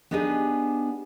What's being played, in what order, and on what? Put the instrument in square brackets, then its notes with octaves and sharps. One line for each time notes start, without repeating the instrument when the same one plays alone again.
[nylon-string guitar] B3 D4 D#4 G4 G#4